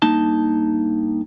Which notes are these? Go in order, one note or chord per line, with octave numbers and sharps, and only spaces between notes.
G2 A#3 D#4 A5